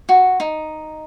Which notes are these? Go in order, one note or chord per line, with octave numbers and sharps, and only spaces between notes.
F#4
D#4